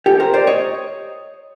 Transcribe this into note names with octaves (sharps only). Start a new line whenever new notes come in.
G4 A4
A#4 C5
C5 D5
C#5 D#5